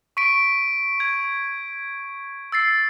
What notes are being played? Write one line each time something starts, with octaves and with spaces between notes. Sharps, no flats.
C#6 B6 D7
G#6
E6 A6 C7